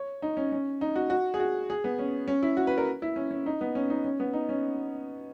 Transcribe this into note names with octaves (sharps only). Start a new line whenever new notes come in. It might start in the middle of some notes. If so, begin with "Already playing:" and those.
Already playing: C#5
D#4
C#4
C#4
D#4
F#4
F#4
G#4
F#4
G#4
B3
C#4
C#4
E4
F#4
B4
A#4
E4
C#4
C#4
D#4
B3
C#4
D#4
C#4
B3
D#4
C#4